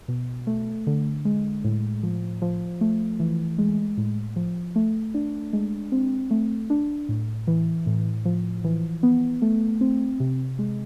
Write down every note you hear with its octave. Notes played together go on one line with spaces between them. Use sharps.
B2
A3
D3
G#3
A2
F3
F3
A3
E3
G#3
A2
F3
A3
D4
G#3
C4
A3
D4
A2
E3
A2
F3
E3
B3
A3
C4
C3
G#3